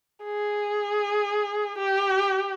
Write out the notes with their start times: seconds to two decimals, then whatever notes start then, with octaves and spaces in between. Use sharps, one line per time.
0.24 G#4
1.78 G4